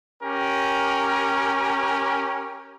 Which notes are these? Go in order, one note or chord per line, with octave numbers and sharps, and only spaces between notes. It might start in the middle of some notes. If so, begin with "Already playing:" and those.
C#4 G4 A#4